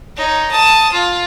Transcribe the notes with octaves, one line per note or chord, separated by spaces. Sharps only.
D#4 C#5
A5 D#6
F4